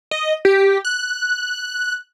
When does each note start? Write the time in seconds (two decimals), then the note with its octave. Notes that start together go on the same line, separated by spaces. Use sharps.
0.11 D#5
0.45 G4
0.85 F#6